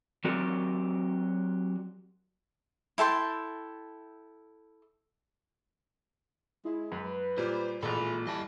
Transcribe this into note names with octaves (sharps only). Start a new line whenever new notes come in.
F#3 C4 F#4 G4 A#4 D5
E4 A4 G5 C6
G#3 E4
F#2 B4
A#2 G3 C5
A1 A#2 G#3 A4 G#5 B5
G3 E4 D#5 A5